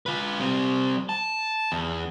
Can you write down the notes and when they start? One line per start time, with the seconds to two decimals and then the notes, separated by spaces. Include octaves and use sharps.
0.06 F4 B4
0.40 G3 C4
1.09 A5
1.72 E2